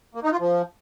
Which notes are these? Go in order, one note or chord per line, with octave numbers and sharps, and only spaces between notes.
A#3
D#4
F4
F3